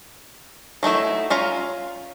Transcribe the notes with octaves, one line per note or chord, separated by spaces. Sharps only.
F#3 A3 D#4 E4
C#4 F4 F5 A#5